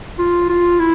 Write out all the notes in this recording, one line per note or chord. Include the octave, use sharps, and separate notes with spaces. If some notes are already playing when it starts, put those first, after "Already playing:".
F4
F4
E4